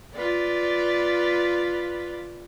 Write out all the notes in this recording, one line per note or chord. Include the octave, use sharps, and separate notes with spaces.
F4 B4 D5